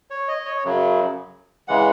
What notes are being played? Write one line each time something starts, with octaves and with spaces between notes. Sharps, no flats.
C#5
D#5
C#5
F#2 C#3 F#3
C#3 E3 G#3 F#5